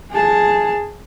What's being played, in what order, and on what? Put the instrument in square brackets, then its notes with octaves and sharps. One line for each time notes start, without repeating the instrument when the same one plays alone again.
[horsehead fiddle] G#4 A5